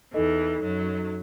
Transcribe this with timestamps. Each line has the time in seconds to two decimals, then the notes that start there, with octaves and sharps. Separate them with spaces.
0.14 E2 E3 D#4 A4 D#5
0.63 F#2 F#3